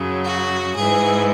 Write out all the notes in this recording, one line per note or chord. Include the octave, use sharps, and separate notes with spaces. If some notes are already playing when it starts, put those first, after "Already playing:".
Already playing: F#2 C#3 F#3
F#4
G#2 E3 G#4